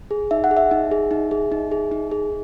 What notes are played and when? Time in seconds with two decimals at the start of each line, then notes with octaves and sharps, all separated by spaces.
0.11 G#4
0.31 D#4 E5
0.44 F#5
0.51 G#4
0.57 E5
0.71 D#4
0.91 G#4
1.11 D#4
1.31 G#4
1.52 D#4
1.72 G#4
1.92 D#4
2.11 G#4